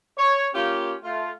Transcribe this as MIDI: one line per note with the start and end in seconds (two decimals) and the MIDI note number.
0.17 0.46 73
0.54 0.93 58
0.54 0.93 61
0.54 0.93 65
0.54 0.93 67
1.03 1.29 57
1.03 1.29 65